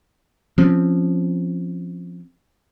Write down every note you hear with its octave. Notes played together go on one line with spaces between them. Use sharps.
F3 C4 C#4